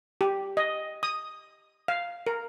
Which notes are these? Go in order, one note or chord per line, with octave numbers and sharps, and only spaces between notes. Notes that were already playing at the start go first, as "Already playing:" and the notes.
G4
D#5
D#6
F5
A#4